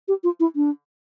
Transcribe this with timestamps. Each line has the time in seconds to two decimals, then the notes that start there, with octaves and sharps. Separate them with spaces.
0.08 G4
0.24 F4
0.40 E4
0.56 D4